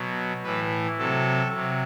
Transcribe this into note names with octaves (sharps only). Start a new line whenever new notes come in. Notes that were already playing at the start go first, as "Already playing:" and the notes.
Already playing: B2 F#3
A2 E3 B4
C3 F#3 A4
C3 F#3